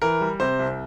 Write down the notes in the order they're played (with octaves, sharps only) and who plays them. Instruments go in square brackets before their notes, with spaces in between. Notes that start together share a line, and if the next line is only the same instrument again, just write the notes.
[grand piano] E3 A#4
G3
C3 C5
C2